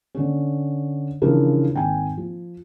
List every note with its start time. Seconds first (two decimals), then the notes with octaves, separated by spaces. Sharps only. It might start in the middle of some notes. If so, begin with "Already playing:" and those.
0.15 D3 C#4
1.22 C#3 E3 F3 D4 E4 A#4
1.74 G#1 G5 G#5
2.17 F3